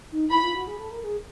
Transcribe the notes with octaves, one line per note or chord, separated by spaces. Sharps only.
D#4
E4 B5
F4
F#4
G#4
A4
A#4
G#4